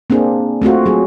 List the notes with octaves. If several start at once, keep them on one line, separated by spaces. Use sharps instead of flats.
A#3 C4 D4 G#4
A3 C4 F4 F#4
F#3 G#4